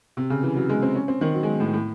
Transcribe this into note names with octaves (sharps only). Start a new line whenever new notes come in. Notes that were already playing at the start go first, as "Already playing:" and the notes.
C3
C#3
E3
F#3
G#3
C4
C#4
C4
D#3
F#3
G#3
F#3
A2
A2